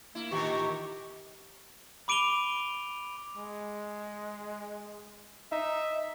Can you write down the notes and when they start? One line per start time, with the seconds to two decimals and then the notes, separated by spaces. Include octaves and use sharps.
0.15 A#3 E4
0.31 A2 D#3 E3 G4 C#6
2.08 B5 D6 D7 D#7 F7 G7
3.37 G#3
5.52 D#4 E5